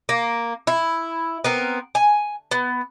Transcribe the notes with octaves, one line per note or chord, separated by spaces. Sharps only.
A#3
E4
B3 C4 A#4
G#5
B3